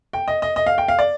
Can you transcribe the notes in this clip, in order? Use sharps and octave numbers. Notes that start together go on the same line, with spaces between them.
G5
D#5
D#5
D#5
F5
G5
F5
D5